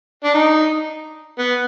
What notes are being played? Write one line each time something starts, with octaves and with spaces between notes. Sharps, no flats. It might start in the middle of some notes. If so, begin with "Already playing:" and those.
D4
D#4
B3